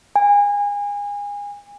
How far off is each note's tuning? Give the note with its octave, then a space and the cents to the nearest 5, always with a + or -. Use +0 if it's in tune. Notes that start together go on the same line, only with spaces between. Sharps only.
G#5 -30